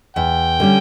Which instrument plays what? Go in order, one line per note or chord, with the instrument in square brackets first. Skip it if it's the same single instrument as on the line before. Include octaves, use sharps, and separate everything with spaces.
[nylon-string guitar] E2 [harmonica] G5
[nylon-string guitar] D3 G3 C#4